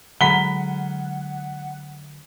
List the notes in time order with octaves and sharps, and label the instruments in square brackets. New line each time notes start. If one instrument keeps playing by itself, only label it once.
[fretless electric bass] D3 F#3 G#3 [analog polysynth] F#5 [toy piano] A#5 B5 [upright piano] B6 G7